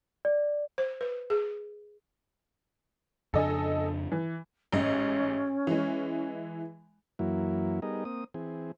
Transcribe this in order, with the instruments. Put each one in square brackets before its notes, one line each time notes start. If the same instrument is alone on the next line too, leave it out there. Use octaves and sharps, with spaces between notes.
[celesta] D5
[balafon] C5
B4
G#4
[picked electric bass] F2 C#3 D4 [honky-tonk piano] A4 D#5 G#5
[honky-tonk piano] E3
[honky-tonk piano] A1 G#2 D#5 [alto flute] C#4
[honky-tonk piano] E3 G#3
[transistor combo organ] F#2 E3 F#3 A#3 E4
G3 B3 D#4 G#4 A#4 D#5
A#3 C4 D#6
E3 C4 G#4